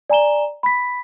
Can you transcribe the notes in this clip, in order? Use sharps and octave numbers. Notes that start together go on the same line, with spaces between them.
D5 G#5 A#5 E7 G7
B5 B6